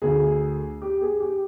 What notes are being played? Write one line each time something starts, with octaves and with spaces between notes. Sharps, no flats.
D2 D3 G#4
G4
G#4
G4